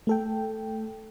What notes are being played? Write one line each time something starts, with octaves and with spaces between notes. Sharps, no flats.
A3 A4 G5